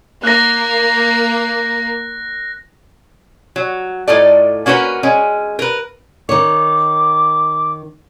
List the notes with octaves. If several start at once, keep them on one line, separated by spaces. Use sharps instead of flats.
A#3 F#6 A#6
F#3
A2 D#4 F4 A4 D5
A#3 C#4 F#4 A#4 B4
G#3 C#4
A#4 B4
D#3 C#5 D6